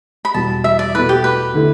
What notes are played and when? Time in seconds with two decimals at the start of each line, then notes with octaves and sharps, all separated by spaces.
0.25 B5
0.34 E2 B2 G3 A5
0.64 E5
0.79 D5
0.94 B2 A3 E4 B4
1.09 G4
1.24 B4
1.54 D3 A3 E4